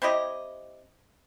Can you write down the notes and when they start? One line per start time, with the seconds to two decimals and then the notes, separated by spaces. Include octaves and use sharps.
0.02 C4 E4 G4 D#5